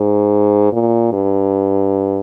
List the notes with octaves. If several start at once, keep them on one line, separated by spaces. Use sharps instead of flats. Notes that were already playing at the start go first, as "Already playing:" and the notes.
Already playing: G#2
A#2
G2